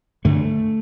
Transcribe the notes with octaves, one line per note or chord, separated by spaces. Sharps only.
G2 D3 A3